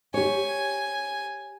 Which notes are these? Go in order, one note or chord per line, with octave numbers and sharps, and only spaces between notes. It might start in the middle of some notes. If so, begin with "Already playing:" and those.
G4 C#5 G#5